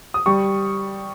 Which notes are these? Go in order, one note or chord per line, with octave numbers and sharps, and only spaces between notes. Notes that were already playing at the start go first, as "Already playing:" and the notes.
D#6
G3 C#6